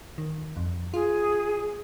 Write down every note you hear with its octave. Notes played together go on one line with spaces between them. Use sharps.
D#3
F2
F4 G#4